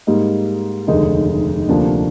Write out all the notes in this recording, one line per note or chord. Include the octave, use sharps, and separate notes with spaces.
G#2 G3 A#3 D#4
F1 D#2 D3 G#3 D#4
D2 C3 F3 A#3 D4